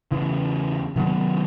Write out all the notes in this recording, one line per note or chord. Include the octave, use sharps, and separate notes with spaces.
E2 C#3 E3
C3 D#3 F#3 B3